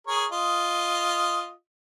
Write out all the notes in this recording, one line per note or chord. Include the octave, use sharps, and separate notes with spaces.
G#4 A#4 C#5
F4 D#5